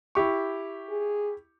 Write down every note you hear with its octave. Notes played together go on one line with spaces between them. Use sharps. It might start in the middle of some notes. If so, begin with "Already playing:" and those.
E4 G4 C#6
G#4